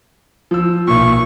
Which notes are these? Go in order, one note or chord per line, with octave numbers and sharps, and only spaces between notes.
F3 E6
B1 A#2 C#6